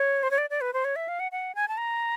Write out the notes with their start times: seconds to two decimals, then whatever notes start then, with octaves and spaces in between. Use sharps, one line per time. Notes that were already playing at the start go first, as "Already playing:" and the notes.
Already playing: C#5
0.23 C5
0.31 C#5
0.38 D5
0.50 D5
0.61 B4
0.73 C5
0.85 C#5
0.96 E5
1.08 F5
1.20 F#5
1.32 F#5
1.55 G#5
1.68 A5
1.77 A#5